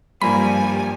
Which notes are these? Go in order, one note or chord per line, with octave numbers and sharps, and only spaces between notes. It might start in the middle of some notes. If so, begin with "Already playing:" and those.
G2 F3 G3 A#3 G#5 A#5 B5